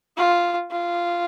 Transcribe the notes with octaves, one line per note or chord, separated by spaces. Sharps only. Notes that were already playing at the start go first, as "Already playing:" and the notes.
F4
F4